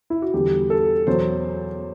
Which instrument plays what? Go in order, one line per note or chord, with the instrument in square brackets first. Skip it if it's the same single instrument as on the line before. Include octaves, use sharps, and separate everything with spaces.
[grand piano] E4
F#4
E2 D3 G3 G4
A4
E2 B2 F#3 C5